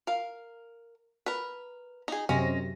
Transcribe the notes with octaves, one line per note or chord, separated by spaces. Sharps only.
A#4 F5
A#4 B4
D#4 G#4
F#2 C3 G#3 C#4 A#6